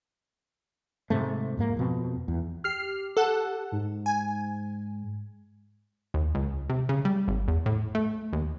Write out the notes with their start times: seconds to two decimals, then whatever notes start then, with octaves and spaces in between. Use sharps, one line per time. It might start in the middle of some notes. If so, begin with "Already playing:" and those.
1.10 G#2 C3 A3
1.57 F2 G#2 A#3
1.77 F2 B2 C4
2.28 E2
2.64 G4 F6 C7
3.17 A4 F#5
3.72 G#2
4.06 G#5
6.14 D#2
6.35 C#2
6.70 C3
6.89 C#3
7.05 G3
7.28 G#1
7.48 E2
7.66 A2
7.95 A3
8.33 D#2